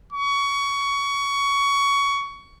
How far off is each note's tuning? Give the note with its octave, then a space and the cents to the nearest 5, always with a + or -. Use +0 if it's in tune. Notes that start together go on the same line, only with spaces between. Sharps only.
C#6 +20